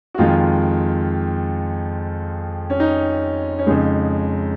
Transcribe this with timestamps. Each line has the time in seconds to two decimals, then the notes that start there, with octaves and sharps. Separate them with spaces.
0.14 F#4
0.18 F2 D#3 G#3 F4
2.70 C#4
2.80 D#4
3.59 C#4
3.67 F2 C#3 G#3 D#4